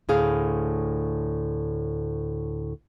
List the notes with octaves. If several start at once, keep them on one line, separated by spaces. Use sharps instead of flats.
D2 A2 G#4 F5